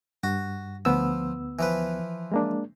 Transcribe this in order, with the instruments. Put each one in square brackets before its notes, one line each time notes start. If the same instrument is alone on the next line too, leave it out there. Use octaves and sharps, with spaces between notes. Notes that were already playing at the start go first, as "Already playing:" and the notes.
[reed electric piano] G2 [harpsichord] F#4
[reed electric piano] D2 B3 E6 [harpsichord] F3
[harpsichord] E3 F3 B4
[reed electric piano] G#3 A#3 D4